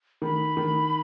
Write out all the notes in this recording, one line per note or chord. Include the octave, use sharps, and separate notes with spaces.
D#3 B5
D#3